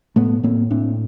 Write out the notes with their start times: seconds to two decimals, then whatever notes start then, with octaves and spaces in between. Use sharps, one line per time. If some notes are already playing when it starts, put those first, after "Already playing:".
0.16 A2 A3 B3
0.43 A2 A#3 C4
0.71 A2 C4 D4